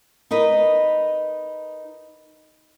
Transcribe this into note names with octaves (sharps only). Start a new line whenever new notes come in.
D#4 A#4 B4 D#5